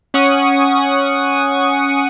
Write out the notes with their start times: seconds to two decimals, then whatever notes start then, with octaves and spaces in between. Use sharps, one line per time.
0.14 C#4 F#5 C#6 D#6